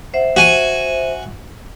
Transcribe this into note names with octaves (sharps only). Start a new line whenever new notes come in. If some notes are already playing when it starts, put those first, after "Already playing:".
C5 E5 F#5
F#4 G#5